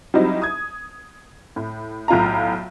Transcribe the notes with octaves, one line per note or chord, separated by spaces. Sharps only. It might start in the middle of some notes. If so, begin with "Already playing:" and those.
F#3 G3 C4 D#4 E4
D#6 G#6
A2
B1 A2 F4 F5 A#5